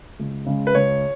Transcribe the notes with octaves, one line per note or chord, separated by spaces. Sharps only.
C#2
C#3 G#3
B4
C#2 C#5